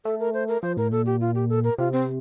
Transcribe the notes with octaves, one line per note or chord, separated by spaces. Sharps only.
A3 A4
A#4
C5
A#4
F3 C5
A2 A#4
A#2 A4
G4
F4
G4
A4
A#4
C3 F4
C4